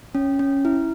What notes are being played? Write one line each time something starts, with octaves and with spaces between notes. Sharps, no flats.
C#4
C#4
E4